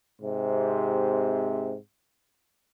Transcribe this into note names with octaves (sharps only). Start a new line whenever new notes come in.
G#2 C3